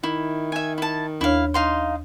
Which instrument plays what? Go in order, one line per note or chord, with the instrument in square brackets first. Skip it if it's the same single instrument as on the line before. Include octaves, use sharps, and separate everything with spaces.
[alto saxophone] D#3 [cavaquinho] E4
[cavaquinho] E5 G#5
E4 A5
[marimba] D#2 D4 C#5 [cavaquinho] E4 F5
[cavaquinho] D#4 F5 C6